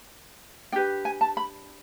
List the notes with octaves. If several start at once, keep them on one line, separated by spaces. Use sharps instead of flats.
D4 G4 B4 G5
G#5
A5
B5